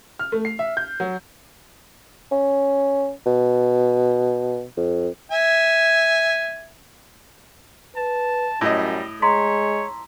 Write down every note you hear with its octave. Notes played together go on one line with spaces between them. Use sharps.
F6
A3
C7
E5
G6
F#3
C#4
B2
F2
E5 G#5
B4 A5
F#2 A2 G3 D#5
G#3 C#5 A#5 C6 B6